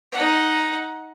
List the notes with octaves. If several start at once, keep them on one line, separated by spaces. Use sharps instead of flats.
D#4 F#5